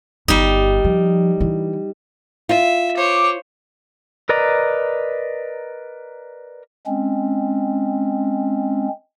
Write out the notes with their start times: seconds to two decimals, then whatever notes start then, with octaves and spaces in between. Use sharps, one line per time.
0.28 G1 G3 D#4
0.84 F3
1.40 E3
2.49 F4 E5
2.96 C5 C#5 D6
4.29 A#4 B4 D5 D#5 A#5
6.87 G#3 C4 C#4